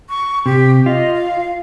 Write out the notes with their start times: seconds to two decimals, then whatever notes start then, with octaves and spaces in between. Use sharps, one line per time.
0.09 C#6
0.46 C3 G4
0.86 F4 D#5
1.14 F5